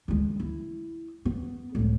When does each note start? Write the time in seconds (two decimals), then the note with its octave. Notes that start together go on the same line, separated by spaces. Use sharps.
0.08 D2 G#3
0.40 E4
1.25 B3
1.75 C#2 A2